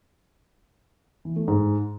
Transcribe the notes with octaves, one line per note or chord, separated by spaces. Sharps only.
E3
A3
G#2